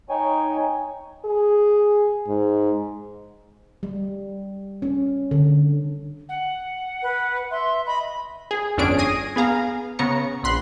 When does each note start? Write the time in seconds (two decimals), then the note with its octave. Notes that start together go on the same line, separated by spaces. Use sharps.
0.09 D#4 C#5 G5 G#5
1.25 G#4
2.28 G#2
3.83 G3
4.82 C#4
5.31 D3
6.29 F#5
7.03 B4
7.51 E5 C6
7.87 D#5 B5
8.51 G#4
8.78 G1 F2 C#4 D4 G#4 D7
8.99 D#6 G#6 A#6 C7 D#7
9.36 B3 G#4 F5 A#5
9.99 C#3 B3 A#5 C#6 C#7
10.44 A#1 B5 C6 F#6